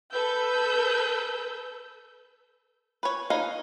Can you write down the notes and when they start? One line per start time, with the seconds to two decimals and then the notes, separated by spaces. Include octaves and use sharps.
0.11 A4 B4 E6 G6
3.03 B4 C#5
3.30 D#4 B4 C#5 D#5 F5